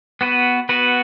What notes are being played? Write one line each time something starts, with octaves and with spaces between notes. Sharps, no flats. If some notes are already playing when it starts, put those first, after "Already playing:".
B3 F#4 B4
B3 F#4 B4